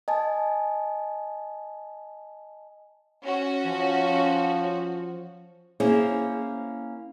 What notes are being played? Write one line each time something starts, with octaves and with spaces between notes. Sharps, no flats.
D#5 G#5 A5
C#4 F#4
F3
A#3 C#4 E4 G#4 C5